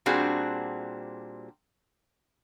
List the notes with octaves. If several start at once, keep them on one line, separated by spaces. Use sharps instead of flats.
A#2 G3 C4 D4 F#4 G#4